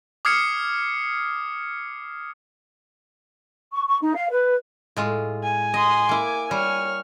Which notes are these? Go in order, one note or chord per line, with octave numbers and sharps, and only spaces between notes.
D6 D#6 F6 G#6 C7 C#7
C#6
C#6
D#4
F5
B4
A2 G#3 F4
G#5
D#5 C6 D#6
A#3 E4 D6
G3 C#5 F6